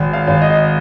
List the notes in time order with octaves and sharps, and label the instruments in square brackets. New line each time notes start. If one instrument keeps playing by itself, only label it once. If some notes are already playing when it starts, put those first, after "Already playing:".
Already playing: [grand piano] G#1
F5
G#1
D#5